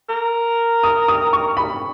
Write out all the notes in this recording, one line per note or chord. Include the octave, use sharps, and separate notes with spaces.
A#4
D#6
D#6
C#6
B5